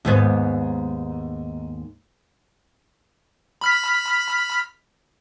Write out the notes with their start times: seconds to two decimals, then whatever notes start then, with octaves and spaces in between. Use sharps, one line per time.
0.05 D#2 G#2 B3
3.61 B5 F6 B6